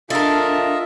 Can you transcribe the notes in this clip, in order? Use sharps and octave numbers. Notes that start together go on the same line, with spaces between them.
D4 F4 A4 A#4 D#5 E5